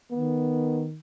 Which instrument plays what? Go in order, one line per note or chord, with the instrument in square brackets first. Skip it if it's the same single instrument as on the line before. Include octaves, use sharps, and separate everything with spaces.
[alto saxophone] D#3 [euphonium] B3